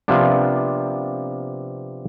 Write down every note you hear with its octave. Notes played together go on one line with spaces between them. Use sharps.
C3 F3 A#3 B3 D4